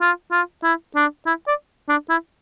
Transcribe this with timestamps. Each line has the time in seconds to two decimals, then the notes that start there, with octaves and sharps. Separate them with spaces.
0.02 F4
0.32 F4
0.63 E4
0.96 D4
1.26 E4
1.48 D5
1.89 D4
2.10 E4